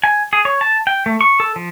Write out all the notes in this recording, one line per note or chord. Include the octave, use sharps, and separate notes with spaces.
G#5
G#4
C#5
A5
G5
A3
C#6
A4
F3